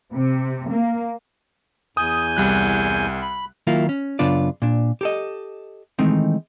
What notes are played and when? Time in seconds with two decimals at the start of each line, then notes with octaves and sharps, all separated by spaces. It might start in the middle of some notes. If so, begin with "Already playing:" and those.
0.12 C3
0.69 A#3
1.97 E2 G#5 D#6 G6
2.37 C2 G3 F#6
3.22 B5
3.67 D#3 F#3 A#3 E4 F4
3.89 C#4
4.19 F#2 C#3 B3 D4 F4 D5
4.62 A#2 D4
5.01 G4 A4 D#5
5.99 D#3 E3 G#3 A3 C4 D#4